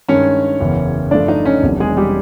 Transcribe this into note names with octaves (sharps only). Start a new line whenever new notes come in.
G2 D#3 G#3 C#4 C#5
F#1 E2 C#3 E3
G2 D3 F3 A3 D4 D5
D#4 D#5
C#4 C#5
E1 E2 C3 D#3 F#3
G#3 G#4
G3 G4